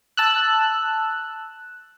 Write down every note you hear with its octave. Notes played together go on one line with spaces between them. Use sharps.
A5 E6 F#6